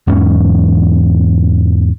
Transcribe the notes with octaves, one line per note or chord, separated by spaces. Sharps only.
E2 G#2 E3 C#4